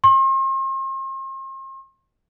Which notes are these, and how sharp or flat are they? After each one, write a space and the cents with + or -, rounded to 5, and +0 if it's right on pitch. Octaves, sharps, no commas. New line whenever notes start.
C6 +40